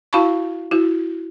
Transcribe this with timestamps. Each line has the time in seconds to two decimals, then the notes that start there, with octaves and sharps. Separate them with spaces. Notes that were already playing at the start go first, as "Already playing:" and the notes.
0.13 E4 F#4 F5 A5 B5 C#6
0.71 E4 F#4